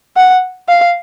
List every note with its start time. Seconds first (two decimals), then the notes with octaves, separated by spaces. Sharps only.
0.17 F#5
0.69 F5